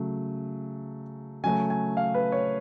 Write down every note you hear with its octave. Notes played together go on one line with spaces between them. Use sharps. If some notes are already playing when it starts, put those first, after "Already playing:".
Already playing: C#3 F#3 A3
C#3 F#3 A3 G#5
G#5
F5
B4
C#5